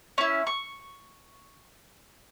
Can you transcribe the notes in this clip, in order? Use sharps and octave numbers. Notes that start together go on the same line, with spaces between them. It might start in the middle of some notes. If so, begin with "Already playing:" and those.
C#4 E4
C#6